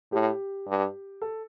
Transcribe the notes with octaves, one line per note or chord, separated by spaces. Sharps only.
A2 G4
G2
A4